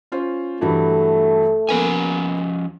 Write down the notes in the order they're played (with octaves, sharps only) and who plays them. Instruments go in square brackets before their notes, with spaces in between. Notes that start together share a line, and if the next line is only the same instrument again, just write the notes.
[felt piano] C#4 F4 C5
[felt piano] G2 E3 F#3 [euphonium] A3
[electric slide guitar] F3 C#4 G#5 [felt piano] A#3 B3